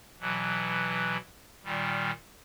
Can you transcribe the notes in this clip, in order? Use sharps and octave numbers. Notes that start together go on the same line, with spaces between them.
B2 E3 F#3
A#2 D#3 G3